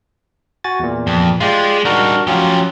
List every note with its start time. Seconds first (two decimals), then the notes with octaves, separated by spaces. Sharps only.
0.64 F#4 G#5 A6
0.80 E2 A#2
1.07 F2
1.40 G#3 F4 G4 D5
1.85 G3 D4 D#4 F#4 A#4
2.27 F3 F#3 C#4 F4 G4